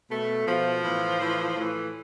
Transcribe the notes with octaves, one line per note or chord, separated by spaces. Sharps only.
B2 A3
B2 F3
A2 E3
A2 E3
A2 E3